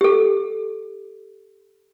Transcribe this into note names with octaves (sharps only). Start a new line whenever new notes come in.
G4 A4